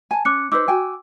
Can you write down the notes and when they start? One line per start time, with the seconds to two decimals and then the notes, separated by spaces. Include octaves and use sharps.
0.11 G#5 A5
0.25 C#4 D6 F#6 C#7
0.52 D#4 B4 C5 D6 E6
0.68 F#4 G5 G#5